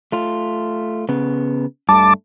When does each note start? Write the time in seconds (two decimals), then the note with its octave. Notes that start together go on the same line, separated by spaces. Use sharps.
0.12 A3 F4
1.09 C#3 B3
1.89 G2 A3 A5 D6